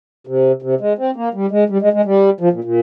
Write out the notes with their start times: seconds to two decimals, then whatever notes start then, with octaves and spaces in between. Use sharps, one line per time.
0.27 C3
0.62 C3
0.81 G#3
0.98 C4
1.16 A#3
1.34 G3
1.51 G#3
1.70 G3
1.82 G#3
1.93 G#3
2.05 G3
2.41 F3
2.53 A#2
2.64 A#2